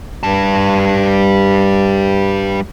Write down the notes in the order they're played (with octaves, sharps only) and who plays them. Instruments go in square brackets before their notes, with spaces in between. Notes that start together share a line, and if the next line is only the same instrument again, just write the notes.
[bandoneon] G2 [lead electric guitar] G3 A5